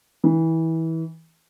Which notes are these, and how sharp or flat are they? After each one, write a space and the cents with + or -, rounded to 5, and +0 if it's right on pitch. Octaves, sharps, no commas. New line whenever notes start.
E3 -25